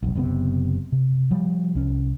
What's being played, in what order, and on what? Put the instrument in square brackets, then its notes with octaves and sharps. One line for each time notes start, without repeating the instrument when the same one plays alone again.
[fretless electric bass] F1 B1
F#1 C3 B3
C3
F3 G3
C2 C#4